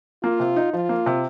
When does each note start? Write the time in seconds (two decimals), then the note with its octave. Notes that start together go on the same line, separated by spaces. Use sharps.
0.23 A#3 F4
0.40 C3
0.56 D#4
0.73 F3 F4
0.89 A#3
1.06 C3